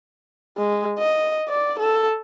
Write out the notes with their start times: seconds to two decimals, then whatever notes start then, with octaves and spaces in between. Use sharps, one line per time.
0.58 G#3
0.99 D#5
1.48 D5
1.80 A4